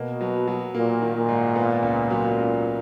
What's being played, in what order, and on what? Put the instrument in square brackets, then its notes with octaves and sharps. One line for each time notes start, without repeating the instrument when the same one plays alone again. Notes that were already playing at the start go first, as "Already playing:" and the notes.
Already playing: [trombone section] B2 [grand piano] A#3
[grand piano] F#3
F#3
[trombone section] A#2 [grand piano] A#3
[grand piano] D#3
[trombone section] A#2
[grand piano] G#2
B3
C#2
F#3
C#3